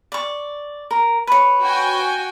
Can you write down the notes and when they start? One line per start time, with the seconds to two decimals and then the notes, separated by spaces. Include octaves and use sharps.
0.12 D5 C#6
0.91 A#4
1.27 B4 C#5
1.62 F#4 G5 G#5